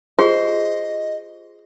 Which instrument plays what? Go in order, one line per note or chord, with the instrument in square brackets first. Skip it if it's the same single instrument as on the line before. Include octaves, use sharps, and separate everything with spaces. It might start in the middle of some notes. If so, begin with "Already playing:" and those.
[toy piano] F4 G4 G#4 [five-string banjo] C5 [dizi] D#5